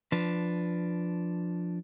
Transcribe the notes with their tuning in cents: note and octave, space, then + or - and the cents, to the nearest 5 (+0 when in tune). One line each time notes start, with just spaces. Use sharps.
F3 +0 D4 -5 B4 +10